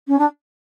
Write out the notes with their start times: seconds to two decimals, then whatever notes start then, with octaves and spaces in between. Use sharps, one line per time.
0.08 C#4
0.18 D4